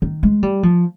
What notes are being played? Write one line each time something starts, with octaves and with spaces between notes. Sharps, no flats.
D#3
G#3
G3
F3